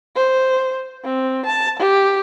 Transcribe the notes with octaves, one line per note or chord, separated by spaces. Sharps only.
C5
C4
A5
G4